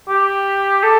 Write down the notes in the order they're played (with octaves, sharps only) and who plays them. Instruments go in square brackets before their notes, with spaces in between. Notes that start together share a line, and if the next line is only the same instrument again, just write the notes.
[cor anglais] G4
A4